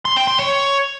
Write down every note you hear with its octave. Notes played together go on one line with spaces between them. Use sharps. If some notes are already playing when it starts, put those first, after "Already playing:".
C6
G5
C6
C#5